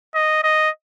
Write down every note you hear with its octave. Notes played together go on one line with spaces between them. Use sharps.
D#5
D#5